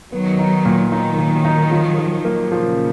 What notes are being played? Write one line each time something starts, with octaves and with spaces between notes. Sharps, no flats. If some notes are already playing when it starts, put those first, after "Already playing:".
D#3 F#3 B3
D#4
A#2
D#3 F#3 D#4
A#2
D#4
F3
F3
A#3
A#2 C#3 F3